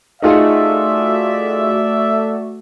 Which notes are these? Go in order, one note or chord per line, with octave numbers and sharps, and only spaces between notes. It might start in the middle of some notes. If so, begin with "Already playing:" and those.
A3 D#4 F4 F#4 G#4 D5 E5